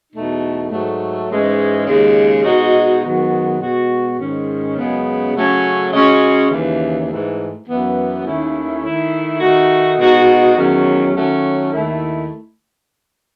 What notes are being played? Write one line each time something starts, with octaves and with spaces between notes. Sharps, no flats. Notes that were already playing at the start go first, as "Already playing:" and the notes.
E2 B2 A3 D#4
G#2 F#3 A3
G#2 E3 G#3 C#4
D#2 C#3 G#3
B2 G#3 D#4 F#4
F#2 D#3 G#3 B3 F#4
B2 G#3 B3 F#4
G#2 D#3 G#3 C#4
F#2 C#3 G#3 B3
C#3 F#3 A3 C#4
C#3 G#3 C#4 F#4
D#2 C#3 E3
G#2 E3 A3
F#2 E3 B3
D#2 D#3 A3 C#4 E4
D#3 A3 E4
D#3 A3 D#4 F#4
B2 G#3 D#4 F#4
E2 D#3 F#3 C#4
D#3 F#3 A3 C#4
D#2 D#3 A3 E4